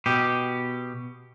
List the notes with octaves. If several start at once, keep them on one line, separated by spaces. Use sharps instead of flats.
B2 G4